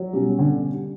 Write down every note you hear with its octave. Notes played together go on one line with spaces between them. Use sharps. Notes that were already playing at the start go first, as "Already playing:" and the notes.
Already playing: F#3
B2 G3 C#4
D3